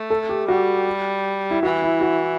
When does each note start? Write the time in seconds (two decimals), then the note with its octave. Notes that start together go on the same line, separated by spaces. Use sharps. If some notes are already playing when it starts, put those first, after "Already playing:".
Already playing: A3
0.10 A4
0.29 G4
0.48 G3 F#4
1.51 E4
1.63 E3 F#4
1.82 E4
2.01 F#4